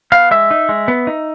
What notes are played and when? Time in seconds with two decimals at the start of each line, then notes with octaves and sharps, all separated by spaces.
0.12 B3 F5
0.31 G#3 E5
0.51 D#4
0.69 G#3
0.88 B3
1.07 D#4